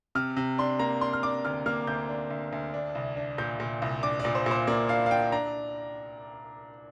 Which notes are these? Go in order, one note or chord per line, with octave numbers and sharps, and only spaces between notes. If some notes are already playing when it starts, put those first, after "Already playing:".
C3 F6
C3
D4 C6
A#3 A#5
D4 C6
F6
D4 D6
D2 F6
A#3 F6
D2 G6
D4
D2
D2
D4
C2
D4
A#2 G6
A#2
C2
D4 D6
D5
A#2
C5
A#2 C5
A#3 D5
D4 F5
F5
D4 G5
D4 A#5